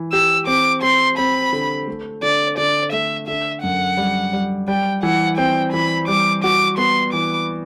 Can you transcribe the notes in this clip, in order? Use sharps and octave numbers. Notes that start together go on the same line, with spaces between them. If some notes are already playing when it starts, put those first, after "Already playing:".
Already playing: E3
G4 E6
C4 D6
C4 C6
C4 B5
D3
A3
D3 D5
D3 D5
A3 E5
D3 E5
F#2 F#5
G3
G3
G3 G5
E3 F#5
C4 G5
E3 B5
G3 D6
F#4 D6
B3 C6
E3 D6